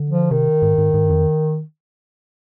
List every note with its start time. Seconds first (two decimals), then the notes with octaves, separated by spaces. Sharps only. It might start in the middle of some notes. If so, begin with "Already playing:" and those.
Already playing: D3
0.10 F3
0.31 C3 D#3
0.62 G#2
0.78 G#2
0.94 G#2
1.05 G2
1.10 F2